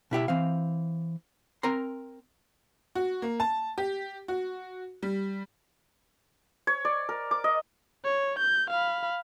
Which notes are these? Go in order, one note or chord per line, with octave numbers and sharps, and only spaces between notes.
B2 E4 G4 E5
E3 C4 F5
C4 A#4 A#5 C6
F#4
A#3
A5
G4
F#4
G3
C#5
D5
A#4
D6
D#5
C#5
G6
F5 B5